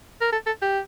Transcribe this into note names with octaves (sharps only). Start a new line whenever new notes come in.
A#4
A4
A4
G4